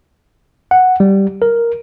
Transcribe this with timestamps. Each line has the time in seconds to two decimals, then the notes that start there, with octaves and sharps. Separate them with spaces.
0.71 F#5
1.00 G3
1.42 A#4